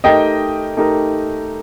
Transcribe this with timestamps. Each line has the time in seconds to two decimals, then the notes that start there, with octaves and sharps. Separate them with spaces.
0.04 A3 D#4 G4 A#4 D#5 G5
0.77 A3 D#4 G4 A#4